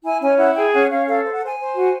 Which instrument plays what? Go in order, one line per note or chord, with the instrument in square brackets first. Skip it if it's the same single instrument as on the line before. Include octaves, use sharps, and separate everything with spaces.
[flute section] E4 G#5
C#4 G#5
E4 F#5
G#4 G5
C#4 F#5
C#4 F5
A4 F5
C5
F#5
C5 G#5
C5
F#4